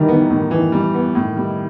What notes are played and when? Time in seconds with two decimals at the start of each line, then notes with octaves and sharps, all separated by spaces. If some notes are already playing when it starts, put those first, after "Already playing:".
Already playing: A2 D#3 E3 G3
0.08 B3
0.30 A2
0.51 E3
0.72 G3
0.94 B3
1.15 A2 D#3
1.36 G3